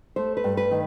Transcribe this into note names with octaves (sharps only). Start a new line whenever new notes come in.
A3 C5
B4
G2
B4
D#3